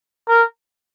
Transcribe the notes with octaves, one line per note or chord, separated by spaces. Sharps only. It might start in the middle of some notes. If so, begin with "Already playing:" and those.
A#4